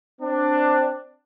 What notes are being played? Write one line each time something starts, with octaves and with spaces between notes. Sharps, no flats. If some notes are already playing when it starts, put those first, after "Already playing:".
C4 D4